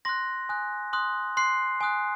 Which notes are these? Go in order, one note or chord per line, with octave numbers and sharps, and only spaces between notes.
C6 F#6 A#6
G#5 D#6 F#6
C6 D#6 F#6
C6 F#6 C7
G#5 D#6 F#6